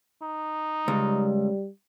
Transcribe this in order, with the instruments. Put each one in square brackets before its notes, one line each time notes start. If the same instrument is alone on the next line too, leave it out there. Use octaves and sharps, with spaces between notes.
[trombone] D#4
[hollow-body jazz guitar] C#2 [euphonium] G3